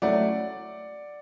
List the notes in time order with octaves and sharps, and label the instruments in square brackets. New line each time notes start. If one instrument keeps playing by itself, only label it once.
[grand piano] F#3 A3 C#4 E4 D5 F#5